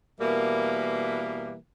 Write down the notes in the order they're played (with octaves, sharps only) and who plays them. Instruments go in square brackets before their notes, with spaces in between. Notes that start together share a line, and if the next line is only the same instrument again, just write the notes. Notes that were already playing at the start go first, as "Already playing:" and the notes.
[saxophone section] B2 E3 G3 A#3